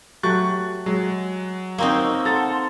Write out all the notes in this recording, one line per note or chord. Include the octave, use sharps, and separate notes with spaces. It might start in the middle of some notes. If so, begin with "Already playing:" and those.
F#3 A3 G4 C#6 F#6 A6
F#3 G#3
A#3 C4 D#4 C#6 E6
A4 F#5 A5 A#5 C6 A6